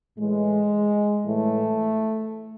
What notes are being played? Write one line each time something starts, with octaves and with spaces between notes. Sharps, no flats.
A2 E3 G#3
A2 E3 A3